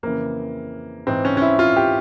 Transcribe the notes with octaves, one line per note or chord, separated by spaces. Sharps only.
F2 C#3 E3 A#3
G#2 E3 C4
C#4
C#4
E4
F4
G4